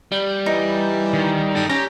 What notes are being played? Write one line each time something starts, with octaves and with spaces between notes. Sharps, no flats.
G3
E3 D#4
D#3
D#4 A4 G5
C#4 G4 A#5